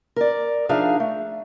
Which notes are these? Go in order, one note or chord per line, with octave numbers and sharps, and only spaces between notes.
A#4 D5
F3 D4 D#4 G#4 E5 F5
A3